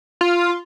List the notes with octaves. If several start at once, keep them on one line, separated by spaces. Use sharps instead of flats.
F4